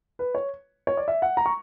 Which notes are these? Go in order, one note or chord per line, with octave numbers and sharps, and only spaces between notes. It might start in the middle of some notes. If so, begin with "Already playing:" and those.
B4
C#5
C#5
D5
E5
F#5
A#5
C#6